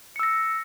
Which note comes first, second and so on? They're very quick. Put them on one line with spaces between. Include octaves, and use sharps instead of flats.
C#7 E6 A#6